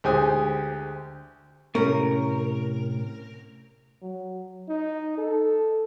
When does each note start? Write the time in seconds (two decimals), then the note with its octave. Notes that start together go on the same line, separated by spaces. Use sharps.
0.04 D2 G#3 G4 C5 G#5 D#6
1.75 A2 C3 C#4 A#4
4.02 F#3
4.68 D#4
5.17 A4